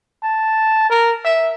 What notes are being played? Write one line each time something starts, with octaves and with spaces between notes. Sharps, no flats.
A5
A#4
E5